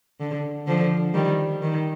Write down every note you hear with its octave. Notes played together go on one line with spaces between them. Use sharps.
D3
D3 F3
D#3 G3
D#3